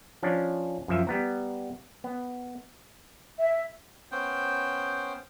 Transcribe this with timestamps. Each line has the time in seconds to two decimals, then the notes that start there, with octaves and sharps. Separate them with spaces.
0.23 F3 C#4 D4
0.88 F#2 F3 E5
1.07 G3 B3 A#5
2.04 B3
3.38 E5
4.12 B3 C#4 C5 G5